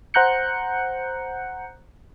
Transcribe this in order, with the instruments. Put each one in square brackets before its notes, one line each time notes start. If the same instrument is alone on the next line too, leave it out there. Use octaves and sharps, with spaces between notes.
[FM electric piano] C5 F#5 A#5 F#6 G6 C#7